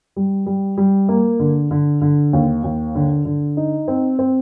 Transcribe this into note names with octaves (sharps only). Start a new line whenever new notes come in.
G3
G3
G3
A#3
D3
D3
D3
D#2
D#2
D3
D3
D#4
C4
C4